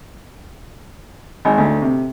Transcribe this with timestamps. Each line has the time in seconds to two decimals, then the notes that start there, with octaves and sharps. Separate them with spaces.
1.45 G#1
1.58 D2
1.82 C3